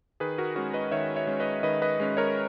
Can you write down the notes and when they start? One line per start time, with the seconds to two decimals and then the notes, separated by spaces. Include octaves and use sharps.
0.20 D#3 G#4 B4
0.38 F#4 A#4
0.56 G#3 C#4 F#4
0.73 B4 D#5
0.91 D#3 C#5 E5
1.16 C#5 E5
1.27 G#3 C#4
1.40 B4 D#5
1.63 D#3 B4 D#5
1.82 B4 D#5
2.00 G#3 C#4
2.17 A#4 C#5